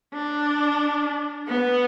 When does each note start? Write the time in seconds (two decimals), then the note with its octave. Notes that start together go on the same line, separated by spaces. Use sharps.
0.14 D4
1.48 B3